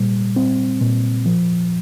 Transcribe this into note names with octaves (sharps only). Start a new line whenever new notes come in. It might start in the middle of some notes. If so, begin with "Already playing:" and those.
Already playing: A#2 G3
C4
A#2
F3